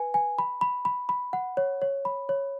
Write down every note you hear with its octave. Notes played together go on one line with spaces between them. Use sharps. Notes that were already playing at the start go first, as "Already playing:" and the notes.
Already playing: B4 G#5
G#5
B5
B5
B5
B5
F#5
C#5
C#5
B5
C#5